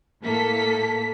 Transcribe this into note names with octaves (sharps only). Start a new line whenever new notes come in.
A2 A#3 A4 B6